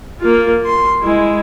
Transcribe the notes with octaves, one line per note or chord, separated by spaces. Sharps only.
A#3 F4
C6
G#3 E4